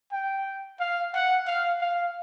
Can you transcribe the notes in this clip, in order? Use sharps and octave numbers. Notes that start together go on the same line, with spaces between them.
G5
F5
F#5
F5
F5